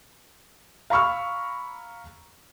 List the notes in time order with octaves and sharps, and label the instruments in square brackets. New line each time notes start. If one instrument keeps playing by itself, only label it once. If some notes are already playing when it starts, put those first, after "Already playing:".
[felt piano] F5 A#5 B5 C#6 E6 F6